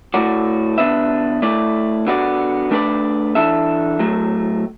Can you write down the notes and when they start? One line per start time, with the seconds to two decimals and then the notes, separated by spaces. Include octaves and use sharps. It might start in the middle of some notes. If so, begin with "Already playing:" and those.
0.14 A2 A3 F#4 D5
0.78 D3 B3 D4 B4 E5
1.42 A3 E4 D5
2.07 D3 B3 F#4 D5
2.71 A3 D4 B4 D5
3.35 E3 D4 A4 E5
3.99 A2 F#3 A3